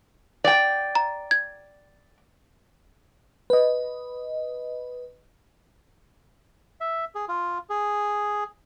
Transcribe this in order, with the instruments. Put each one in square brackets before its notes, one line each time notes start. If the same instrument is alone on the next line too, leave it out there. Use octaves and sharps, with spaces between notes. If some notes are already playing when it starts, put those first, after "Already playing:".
[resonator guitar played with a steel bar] D5 G5
[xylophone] A#5
G#6
[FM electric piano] B4 D#5
[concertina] E5
G#4
F4
G#4